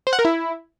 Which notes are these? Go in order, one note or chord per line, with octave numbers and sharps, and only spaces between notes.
C5
F#5
A#4
E4